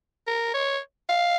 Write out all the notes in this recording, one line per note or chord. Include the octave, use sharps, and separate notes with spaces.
A#4
C#5
F5